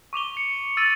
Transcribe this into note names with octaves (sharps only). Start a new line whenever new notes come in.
C#6 D6 F7 G7
C#7
E6 A6 D#7